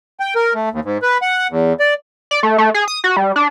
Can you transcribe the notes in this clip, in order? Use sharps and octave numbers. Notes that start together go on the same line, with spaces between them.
G5
A#4
A3
D#2
G#2
B4
F#5
E2
D5
D5
A3
A3
G#4
D#6
F#4
G3
D4